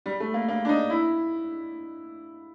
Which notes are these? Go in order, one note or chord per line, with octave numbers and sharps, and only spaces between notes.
G3
A3
A#3
A#3
D4
D#4
E4